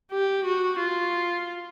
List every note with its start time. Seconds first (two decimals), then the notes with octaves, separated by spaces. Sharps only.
0.11 G4
0.45 F#4
0.79 F4